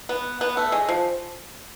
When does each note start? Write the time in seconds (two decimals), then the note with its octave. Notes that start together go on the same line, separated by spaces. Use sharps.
0.09 B3
0.41 B3
0.57 A3
0.72 G#3
0.89 F3